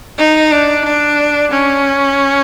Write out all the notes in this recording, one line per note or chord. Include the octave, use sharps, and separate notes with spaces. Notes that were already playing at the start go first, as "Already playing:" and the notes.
D#4
D4
D4
C#4